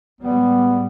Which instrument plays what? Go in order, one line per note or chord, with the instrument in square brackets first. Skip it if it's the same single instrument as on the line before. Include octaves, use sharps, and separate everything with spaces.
[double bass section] A2 G3 G#3 [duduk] B3